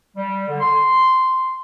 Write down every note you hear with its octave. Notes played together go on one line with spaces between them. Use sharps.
G3
D3
C6